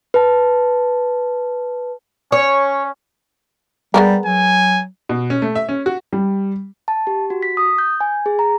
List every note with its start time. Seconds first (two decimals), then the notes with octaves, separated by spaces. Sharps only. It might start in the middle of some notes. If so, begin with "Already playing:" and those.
0.14 B4 A5
2.32 C#4 C#5
3.94 G3 G#3 B3 A#4
4.26 F#3 G#5
5.09 B2
5.30 C#4
5.42 A3
5.55 E5
5.69 C#4
5.86 F#4
6.13 G3
6.88 A5
7.07 G4
7.30 F#4
7.43 B6
7.57 D#6
7.78 G6
8.01 G#5
8.26 G#4
8.39 A#5